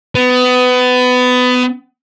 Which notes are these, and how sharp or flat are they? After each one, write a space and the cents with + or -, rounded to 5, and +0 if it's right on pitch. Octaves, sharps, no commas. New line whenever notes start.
B3 +25